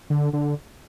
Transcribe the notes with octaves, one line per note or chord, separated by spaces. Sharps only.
D3
D3